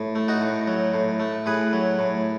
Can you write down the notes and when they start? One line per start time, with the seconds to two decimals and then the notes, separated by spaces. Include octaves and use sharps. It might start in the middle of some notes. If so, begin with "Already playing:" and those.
Already playing: A2
0.15 A3
0.28 D#4 F#4
0.41 A2
0.67 F#3
0.94 A2
1.20 A3
1.46 A2 G#4 B4
1.73 F#3
1.99 A2